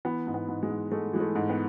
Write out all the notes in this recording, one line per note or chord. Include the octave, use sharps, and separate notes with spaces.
E3 B3
G#2
B3
G#2
G#3
G#2
G#3 A3
E3 G#3
A3
G#2
B3